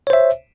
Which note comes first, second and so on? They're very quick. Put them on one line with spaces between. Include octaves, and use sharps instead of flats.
C#5 C5 E5